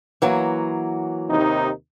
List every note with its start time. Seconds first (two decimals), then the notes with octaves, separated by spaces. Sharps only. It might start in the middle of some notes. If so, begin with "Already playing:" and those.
0.22 E3 F#3 A#3
1.30 D#2 C3 D#4